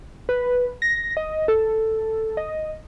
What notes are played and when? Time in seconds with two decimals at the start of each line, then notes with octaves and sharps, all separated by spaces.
0.29 B4
0.82 A#6
1.17 D#5
1.48 A4
2.37 D#5